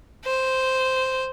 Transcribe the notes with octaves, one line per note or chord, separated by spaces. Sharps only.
C5